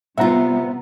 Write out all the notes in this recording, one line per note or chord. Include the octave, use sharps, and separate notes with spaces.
C3 G3 B3 F4 E5 F#5 A#5